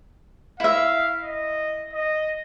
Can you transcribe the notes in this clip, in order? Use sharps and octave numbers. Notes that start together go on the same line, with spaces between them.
E4 E5 F5
D#5
D#5